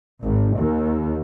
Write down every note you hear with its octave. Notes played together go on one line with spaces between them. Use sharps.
G#1
D#2